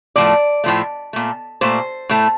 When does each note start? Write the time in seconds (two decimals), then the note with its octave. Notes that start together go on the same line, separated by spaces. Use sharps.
0.16 A2 F3 A3 D5
0.64 A2 F3 A3
1.13 A#2 A3
1.61 A#2 A3 C5
2.09 A2 A3